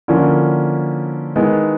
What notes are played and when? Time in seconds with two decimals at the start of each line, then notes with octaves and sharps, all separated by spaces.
0.08 D3 F3 A#3 C#4 E4
1.36 D#3 G#3 B3 E4